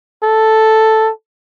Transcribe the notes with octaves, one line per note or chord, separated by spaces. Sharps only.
A4